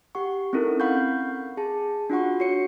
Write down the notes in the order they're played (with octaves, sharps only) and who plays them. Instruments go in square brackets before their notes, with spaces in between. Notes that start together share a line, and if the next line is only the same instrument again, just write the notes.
[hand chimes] G4 F#5 C#6
C4 C#4 D#4 E4 A4 A#4
F5 F#5 B5 C#6 G6
G#4 A5
D4 F4 F#4 F#5 C#6
F#4 C#5 C#7